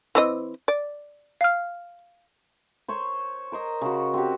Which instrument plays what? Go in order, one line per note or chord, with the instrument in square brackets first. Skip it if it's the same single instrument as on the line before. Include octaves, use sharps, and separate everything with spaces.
[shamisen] E3 C4 D#5
D5
[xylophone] F5 F6
[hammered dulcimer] C5 C#5 C6
A#4 C5 D#5
C#3 F#4
C4 F#4 G4